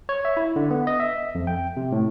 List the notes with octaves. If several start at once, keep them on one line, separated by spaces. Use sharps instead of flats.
C#5
E5
E4
D3
B3
D#5
E5
F2
G5
C3
A2